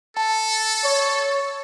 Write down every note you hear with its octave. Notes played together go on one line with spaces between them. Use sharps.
A4 A5
C#5